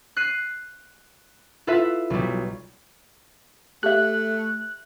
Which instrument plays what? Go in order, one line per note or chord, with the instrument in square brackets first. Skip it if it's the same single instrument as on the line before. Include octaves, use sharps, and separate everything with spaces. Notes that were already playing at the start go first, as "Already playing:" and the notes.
[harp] F#6 C7 D#7
E4 F4 A4 B4 E5
B1 G3
[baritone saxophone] A3 [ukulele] G4 E5 [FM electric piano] F#6